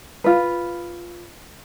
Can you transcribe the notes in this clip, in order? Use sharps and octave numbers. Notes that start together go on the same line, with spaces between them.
F4 B4